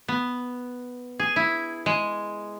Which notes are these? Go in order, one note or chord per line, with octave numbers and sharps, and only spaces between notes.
B3
G#4
E4
G#3